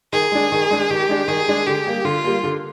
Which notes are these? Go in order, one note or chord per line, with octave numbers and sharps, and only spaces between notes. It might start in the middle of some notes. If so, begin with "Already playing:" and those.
D#3 G#4
G#3 D4
D#3
G#3 D4
D#3 G4
G#3 D4
D#3 G#4
G#3 D4
D3 G4
G3 A#3
D3 F4
G3 A#3
D3